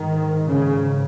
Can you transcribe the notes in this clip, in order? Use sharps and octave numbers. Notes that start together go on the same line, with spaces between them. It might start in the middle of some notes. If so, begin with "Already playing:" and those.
Already playing: G#2 D#3
C#3